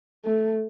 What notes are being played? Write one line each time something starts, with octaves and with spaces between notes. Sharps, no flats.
A3